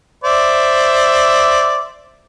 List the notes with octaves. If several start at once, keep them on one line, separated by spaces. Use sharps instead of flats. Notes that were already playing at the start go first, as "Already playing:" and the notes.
C5 D5 E5